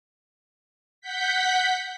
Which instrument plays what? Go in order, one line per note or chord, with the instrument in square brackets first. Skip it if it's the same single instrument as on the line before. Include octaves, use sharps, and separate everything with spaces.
[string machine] F#5 G6 B6